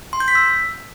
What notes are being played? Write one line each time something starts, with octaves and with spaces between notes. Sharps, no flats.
C6
G6
B6
E6